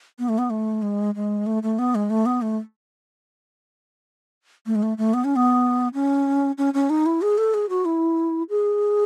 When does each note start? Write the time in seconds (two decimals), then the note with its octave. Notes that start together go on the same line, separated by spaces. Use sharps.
0.19 B3
0.29 A3
0.38 B3
0.50 A3
0.82 G#3
1.15 G#3
1.46 A3
1.63 A3
1.79 B3
1.95 G#3
2.10 A3
2.26 B3
2.42 A3
4.66 A3
4.75 G#3
4.82 A3
4.98 A3
5.14 B3
5.24 C#4
5.36 B3
5.94 C#4
6.58 C#4
6.74 C#4
6.90 D#4
7.06 E4
7.22 G#4
7.38 A4
7.54 G#4
7.69 F#4
7.85 E4
8.50 G#4